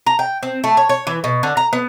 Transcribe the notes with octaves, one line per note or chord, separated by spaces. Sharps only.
A#5
G5
C4
A3
C#5
C#5
E3
B2
D3
A#5
B3